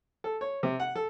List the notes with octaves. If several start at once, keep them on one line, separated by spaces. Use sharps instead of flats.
A4
C#5
C3
F#5
A4